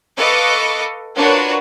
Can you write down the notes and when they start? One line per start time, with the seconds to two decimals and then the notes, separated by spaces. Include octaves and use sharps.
0.18 A4 B4 D#5 F5 C#6 D6
1.16 D4 F4 F#4 A#4 B4 C#5